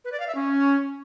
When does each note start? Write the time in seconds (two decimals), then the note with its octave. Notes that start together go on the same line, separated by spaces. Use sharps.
0.05 B4
0.12 D5
0.20 F5
0.27 E5
0.35 C#4